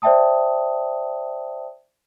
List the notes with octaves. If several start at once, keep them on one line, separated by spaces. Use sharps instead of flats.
C5 D5 E5 G5 A5 D#6